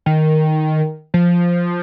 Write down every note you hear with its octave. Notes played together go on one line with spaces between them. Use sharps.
D#3
F3